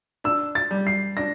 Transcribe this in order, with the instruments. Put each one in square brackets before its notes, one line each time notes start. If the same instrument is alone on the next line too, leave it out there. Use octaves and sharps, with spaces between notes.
[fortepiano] D4 [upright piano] E6
[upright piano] A6
[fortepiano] G3
[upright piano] C7
[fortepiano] D4 [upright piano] A#6